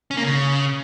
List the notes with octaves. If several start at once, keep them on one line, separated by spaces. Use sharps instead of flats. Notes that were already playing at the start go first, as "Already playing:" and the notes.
C#4
A#3
C#3